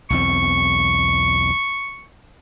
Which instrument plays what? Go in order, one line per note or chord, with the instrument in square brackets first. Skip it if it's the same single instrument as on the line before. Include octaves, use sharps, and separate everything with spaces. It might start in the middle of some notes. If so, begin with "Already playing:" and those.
[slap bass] B1 E2 C4 [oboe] C#6